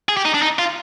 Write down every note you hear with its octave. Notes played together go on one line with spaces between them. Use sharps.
G#4
G4
D#4
D4
D#4
F4